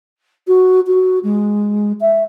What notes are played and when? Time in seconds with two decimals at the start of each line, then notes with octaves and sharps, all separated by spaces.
0.47 F#4
0.87 F#4
1.23 G#3
2.01 E5